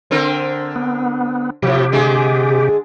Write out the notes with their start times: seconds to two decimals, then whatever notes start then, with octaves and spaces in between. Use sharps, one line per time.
0.11 D3 C4 A#4
0.76 B3
1.63 A2 C3 F3 G4
1.92 D3 G#3 G#4